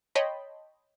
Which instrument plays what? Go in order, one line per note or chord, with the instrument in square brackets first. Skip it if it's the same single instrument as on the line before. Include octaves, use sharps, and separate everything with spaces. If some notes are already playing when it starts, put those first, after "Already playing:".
[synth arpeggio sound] C#5 D#5 G5 A5 B5 C6